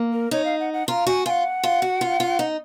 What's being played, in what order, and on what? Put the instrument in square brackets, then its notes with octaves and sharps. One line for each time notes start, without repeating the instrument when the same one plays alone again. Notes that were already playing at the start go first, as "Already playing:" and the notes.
Already playing: [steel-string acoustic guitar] A#3
[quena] A#4
[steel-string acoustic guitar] D#4 [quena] C#5
[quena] F5
F#5
F#5
[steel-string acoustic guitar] F4 [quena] A#5
[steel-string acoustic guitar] F#4 [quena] G#5
[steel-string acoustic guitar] F4 [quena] G#5
[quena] F#5
[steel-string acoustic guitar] F4
F#4
F4
F4
D#4